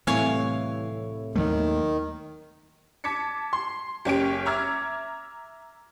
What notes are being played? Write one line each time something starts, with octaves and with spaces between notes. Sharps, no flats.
C2 A2 E3 C#5 E5 F5 G#5
D#2 D#3 F#3 A3
A5 D6 G#6 B6 C#7
C6
F#1 C#4 G4 D7
E5 A#5 D6 E6 F6 G#6